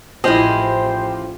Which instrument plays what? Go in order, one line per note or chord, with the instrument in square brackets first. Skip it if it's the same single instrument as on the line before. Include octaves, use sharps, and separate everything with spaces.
[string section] A1 [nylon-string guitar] F3 E4 [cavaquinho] G4 G#4 D#5 [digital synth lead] C5